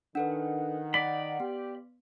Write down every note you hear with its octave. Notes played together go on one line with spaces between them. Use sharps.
D#3 D4 A4 B4 F#5
D5 B5 A6
B3 G4